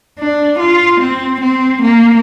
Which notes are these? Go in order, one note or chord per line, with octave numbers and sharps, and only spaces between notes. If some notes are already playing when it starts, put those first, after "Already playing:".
D4
F4
C4
C4
A#3